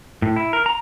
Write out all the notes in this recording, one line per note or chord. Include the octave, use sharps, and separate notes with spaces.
A2
E4
A#4
A#5